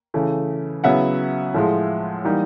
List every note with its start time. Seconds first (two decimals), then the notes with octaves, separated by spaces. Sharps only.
0.14 C#3 E3 A3
0.84 C#3 F#3 B3 E4 E5 F#5
1.54 A2 F3 G#3
2.24 E3 G3 A#3 D#4